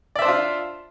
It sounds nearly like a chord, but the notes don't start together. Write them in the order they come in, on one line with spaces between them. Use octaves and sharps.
D5 E5 C5 D4 F4